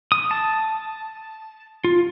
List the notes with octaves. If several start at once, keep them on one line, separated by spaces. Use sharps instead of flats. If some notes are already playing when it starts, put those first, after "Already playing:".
D#6
A5
F4